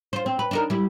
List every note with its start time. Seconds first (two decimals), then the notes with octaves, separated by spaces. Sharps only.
0.13 F4 C5
0.26 C4
0.39 B4
0.51 D4 D#4 A#4
0.70 G3 E4